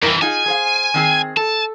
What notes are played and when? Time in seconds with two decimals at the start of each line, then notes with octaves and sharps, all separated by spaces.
0.02 F2 E3 G3 E4 A#4
0.22 D#4 F4 G#4 G#5
0.46 G#4 C5 F5
0.94 D#3 C4 G#4
1.37 A4 A5